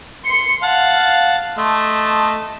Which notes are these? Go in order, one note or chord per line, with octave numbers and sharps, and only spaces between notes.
C6 C#7
F5 F#5 A5
A3 D#5 A5 C6